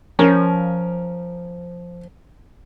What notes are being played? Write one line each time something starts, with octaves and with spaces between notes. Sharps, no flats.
F3 C#4 A#4